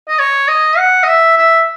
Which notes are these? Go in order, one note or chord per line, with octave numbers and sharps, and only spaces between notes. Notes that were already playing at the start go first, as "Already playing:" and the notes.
D#5
C#5
D#5
F#5
D#5
E5
E5